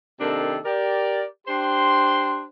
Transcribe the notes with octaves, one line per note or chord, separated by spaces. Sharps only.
C3 D#3 A#3 D4 A4
G4 A#4 D5
D4 G4 C5 C6